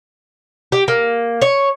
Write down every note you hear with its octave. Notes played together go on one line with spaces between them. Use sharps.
G4
A#3
C#5